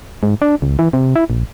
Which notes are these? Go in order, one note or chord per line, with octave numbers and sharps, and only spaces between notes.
G#2
D4
C#2
E3
C3
E4
A#1